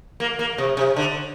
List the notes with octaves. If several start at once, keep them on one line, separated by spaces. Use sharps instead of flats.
A#3
A#3
C3
C3
D3